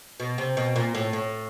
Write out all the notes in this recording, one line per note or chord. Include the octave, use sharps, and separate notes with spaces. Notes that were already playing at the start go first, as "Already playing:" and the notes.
B2
C3
B2
A#2
A2
A2